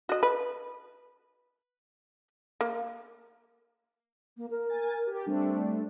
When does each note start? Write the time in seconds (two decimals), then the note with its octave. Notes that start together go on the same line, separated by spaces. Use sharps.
0.09 F#4 D#5
0.23 B4
2.61 A#3
4.37 A#3
4.50 A#4
4.69 G#5 A6
5.07 G4
5.26 G3 A3 C4 D4